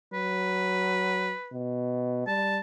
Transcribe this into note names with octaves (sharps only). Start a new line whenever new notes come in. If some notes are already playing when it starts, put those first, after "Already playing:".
F#3 B4
B2
G3 A5